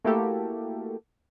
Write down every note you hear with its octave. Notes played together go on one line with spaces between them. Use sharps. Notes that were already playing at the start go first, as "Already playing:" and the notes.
A3 A#3 E4 F#4 G4 A4